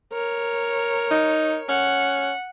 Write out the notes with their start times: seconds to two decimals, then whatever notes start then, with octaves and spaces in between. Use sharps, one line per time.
0.13 A#4 C#5
1.11 D#4
1.69 C#4 F#5